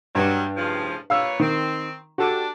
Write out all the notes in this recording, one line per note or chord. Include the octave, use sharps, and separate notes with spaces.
G2 F#3 G3
A2 C#3 F3
A#2 B4 C#5 F5 E6
D#3 C4
D4 F#4 G4 A4